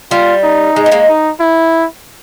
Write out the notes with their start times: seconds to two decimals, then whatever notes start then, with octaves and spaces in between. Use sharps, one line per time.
0.11 G3 F4
0.43 D#4
0.76 G#3
0.86 B3
0.92 G#3 A#3
1.08 D#4
1.40 E4